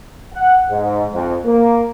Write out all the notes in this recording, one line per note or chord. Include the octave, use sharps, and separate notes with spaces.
F#5
G#2
F2
A#3